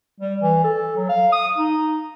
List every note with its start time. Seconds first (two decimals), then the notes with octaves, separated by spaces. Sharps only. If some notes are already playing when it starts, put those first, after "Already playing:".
0.20 G3
0.42 E3
0.64 A4
0.96 F#3
1.09 F5
1.32 D#6
1.58 D#4